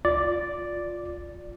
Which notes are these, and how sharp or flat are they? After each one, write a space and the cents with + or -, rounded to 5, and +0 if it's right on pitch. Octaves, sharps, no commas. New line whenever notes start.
F4 +10 D5 +0